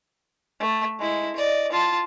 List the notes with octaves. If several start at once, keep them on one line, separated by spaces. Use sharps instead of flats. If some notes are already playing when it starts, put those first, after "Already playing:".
A3
G#3 E4
D5 D#5
F4 A5